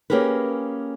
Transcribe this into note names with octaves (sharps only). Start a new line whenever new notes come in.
A#3 C#4 G4 G#4 A#4 B4